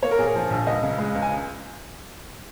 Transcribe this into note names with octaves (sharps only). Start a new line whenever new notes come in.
A#3 C#5
A#4
A#2 G#4
A#4
F3
A#1
C#2 D#5
C#3
G#3
C#2
G#5